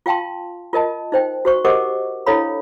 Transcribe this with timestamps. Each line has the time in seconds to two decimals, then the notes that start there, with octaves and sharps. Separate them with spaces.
0.06 F4 F5 G5 A5 C6
0.73 F4 A#4 D#5 A5
1.12 D#4 C5 G5
1.45 F#4 C5 C#6
1.65 G4 A#4 C5 D#5 F#5 D6
2.26 D4 E4 A4 C#5 F5 B5